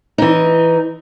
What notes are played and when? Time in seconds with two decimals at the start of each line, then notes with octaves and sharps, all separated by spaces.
0.18 E3 D#4